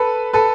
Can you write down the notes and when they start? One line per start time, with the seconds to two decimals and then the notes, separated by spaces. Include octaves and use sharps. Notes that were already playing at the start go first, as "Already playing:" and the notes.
Already playing: A4 B4
0.33 A4 B4